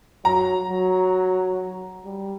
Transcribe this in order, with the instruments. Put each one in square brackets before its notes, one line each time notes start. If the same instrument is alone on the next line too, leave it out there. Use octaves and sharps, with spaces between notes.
[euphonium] F#3 [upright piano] A#5
[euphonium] F#3
G3